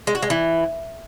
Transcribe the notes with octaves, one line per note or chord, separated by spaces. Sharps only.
G#3
F#4
G#3
E3